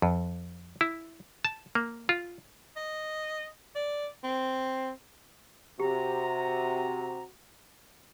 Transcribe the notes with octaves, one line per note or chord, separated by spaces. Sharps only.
F2
E4
A5
A#3
F4
D#5
D5
C4
C3 F#4 G4 A#5